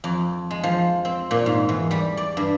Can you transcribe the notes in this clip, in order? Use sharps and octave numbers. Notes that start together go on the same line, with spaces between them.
F2
G#3
F3
C4
A#2
G#2
E2
G3
D5
G2